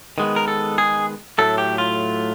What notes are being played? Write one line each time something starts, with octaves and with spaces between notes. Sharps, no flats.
D#3 G#3 B3
A#4
A4
G#4
A2 F#3 A3 A4
G4
F4